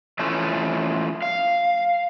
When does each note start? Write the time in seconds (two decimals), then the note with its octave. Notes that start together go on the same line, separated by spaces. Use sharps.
0.19 E3 F3 A3 C#4
1.22 F5